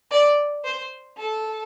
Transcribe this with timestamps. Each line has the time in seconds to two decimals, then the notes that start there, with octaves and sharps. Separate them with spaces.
0.11 D5
0.64 C5
1.17 A4